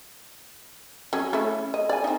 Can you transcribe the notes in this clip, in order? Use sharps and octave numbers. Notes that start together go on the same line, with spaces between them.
F#3 C#4
A3 C#4 E4
D#5
D5 G#5
C4 D#4